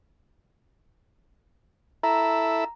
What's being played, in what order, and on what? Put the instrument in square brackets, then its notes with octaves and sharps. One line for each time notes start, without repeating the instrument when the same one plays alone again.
[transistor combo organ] E4 A4 E5 [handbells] A#5